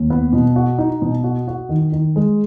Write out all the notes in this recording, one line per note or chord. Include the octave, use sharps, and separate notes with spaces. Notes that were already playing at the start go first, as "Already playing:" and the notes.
Already playing: D#2
B3
B2
F#4
D#4
B2
F#4
F#4
D#3
D#3
G#3